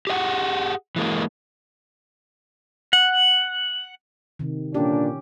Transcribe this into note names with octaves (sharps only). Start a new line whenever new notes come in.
G4 G#4 D#5 F#5
E3 G#3 A#3
F#5
C3 D#3
A#2 D3 C#4 D4 G4